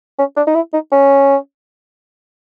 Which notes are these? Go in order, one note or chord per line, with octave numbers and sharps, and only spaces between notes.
C#4
D4
D#4
E4
D#4
C#4